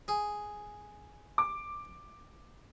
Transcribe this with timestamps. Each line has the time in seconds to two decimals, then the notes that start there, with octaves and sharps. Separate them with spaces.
0.08 G#4
1.38 D6